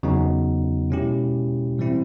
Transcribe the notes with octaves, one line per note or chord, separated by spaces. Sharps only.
E2 C#3 F#3 B3 D#4
B2 G#3 C#4 E4 G4
A2 E3 G3 C4 E4